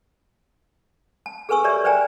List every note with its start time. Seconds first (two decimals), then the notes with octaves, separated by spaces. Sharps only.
1.26 A5
1.49 G#4 A4 B4 G#5 C#6 E6
1.64 G4 A#4 C#5 D5 E5 C#6
1.84 B4 C5 D5 G5 G#5 A#5